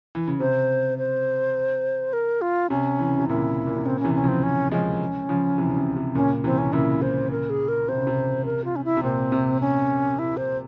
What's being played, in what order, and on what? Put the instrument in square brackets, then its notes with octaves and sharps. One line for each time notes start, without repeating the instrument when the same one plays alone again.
[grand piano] E3
C#3
[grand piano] C3 [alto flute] C5
[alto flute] C5
A#4
F4
[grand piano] C3 [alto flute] C#4
[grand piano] E3
C#3
C3
[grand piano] A#2 C#3 [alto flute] E4
[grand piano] A#2
C3
[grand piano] A#2 C#3 [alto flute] C4
[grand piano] C3 E3 [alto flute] C#4
[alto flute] C#4
[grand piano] C#3 F3 [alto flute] C4
[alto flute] C#4
[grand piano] F3 G#3 [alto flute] C#4
[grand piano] C#3 F3
C3 E3
C#3
C3
C3
[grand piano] A#2 C#3 [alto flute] C#4
[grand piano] C3 E3 [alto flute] C4
[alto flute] C#4
[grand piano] A#2 C#3 [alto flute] E4
[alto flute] C5
A#4
G#4
A#4
[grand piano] C3 [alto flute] C5
[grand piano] C#3
C3
[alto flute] A#4
F4
C#4
E4
[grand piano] C3
[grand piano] A#2 [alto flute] C4
[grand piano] C3
[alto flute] C#4
E4
C5